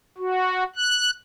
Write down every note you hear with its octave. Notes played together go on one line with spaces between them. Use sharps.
F#4
F#6